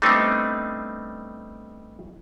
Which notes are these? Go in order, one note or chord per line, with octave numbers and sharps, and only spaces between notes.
G3 A3 B3 C4 D4 D#4